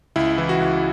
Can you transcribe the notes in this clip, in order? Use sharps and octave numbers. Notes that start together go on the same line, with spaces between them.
C#2 E4
E3
F#4
C#2